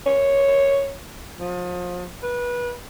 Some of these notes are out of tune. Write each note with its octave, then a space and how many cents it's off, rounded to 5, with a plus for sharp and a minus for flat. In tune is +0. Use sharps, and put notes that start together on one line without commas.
C#5 -5
F3 +35
B4 -25